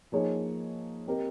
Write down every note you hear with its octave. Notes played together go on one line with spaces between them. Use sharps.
F3 A#3 D#4 G#4 C#5
C4 G4 A#4 D#5